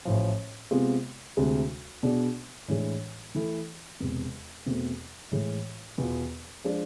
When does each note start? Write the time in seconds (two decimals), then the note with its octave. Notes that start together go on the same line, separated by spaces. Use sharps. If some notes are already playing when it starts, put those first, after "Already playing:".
0.05 A1 A2 F3
0.71 C3 G#3 B3 F4
1.37 D2 C3 G#3
2.03 B2 B3 D4 G#4 D5
2.68 A2 E3 G#3 D4
3.35 E3 A3 E4 A4
4.00 E1 E2 C3
4.66 E2 B2 A3 C4
5.32 A2 E3 G#3
5.98 E2 B2 B3 F4
6.64 F3 G#3 D4